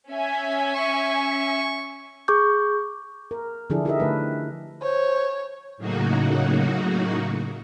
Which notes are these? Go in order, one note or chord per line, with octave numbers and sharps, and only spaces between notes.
C#4 E5 G#5
C#6
G#4 C#6 D6 G6
A#4
D3 F3 D4 E4 G#4 A4
D#4 E4 G4 A#4 D#5 E5
D3 A3 B4
C5 C#5
A2 C#3 F#3 A#3 D#4 F#4